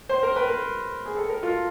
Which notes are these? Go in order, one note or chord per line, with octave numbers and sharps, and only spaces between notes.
C5
A#4
B4
A#4
G#4
A4
A#4
F4